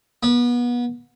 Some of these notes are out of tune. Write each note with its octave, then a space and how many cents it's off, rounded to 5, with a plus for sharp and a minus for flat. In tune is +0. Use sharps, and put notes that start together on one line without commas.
B3 -30